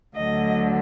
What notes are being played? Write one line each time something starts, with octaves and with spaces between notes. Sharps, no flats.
D2 D3 F#3 D#5